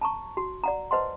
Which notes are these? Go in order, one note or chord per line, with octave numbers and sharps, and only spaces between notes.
A5 A#5 C#6
F#4
D5 F#5 A#5
B4 C5 D#5 F#5 A5 C6